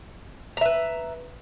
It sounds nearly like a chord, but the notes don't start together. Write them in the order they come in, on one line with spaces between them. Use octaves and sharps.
A#5 E5 B4